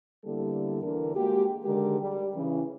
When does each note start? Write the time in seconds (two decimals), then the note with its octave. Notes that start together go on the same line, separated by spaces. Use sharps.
0.25 D3 G3 A#3 B3 E4 A4
0.82 E2 D3 A#4
1.16 G#3 A#3 F#4 G4
1.64 D3 D#3 G#3 G4 G#4 A#4
2.00 G3
2.35 C#3 E3